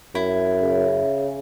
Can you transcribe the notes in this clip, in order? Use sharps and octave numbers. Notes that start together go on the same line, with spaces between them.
F#2 E4
C#3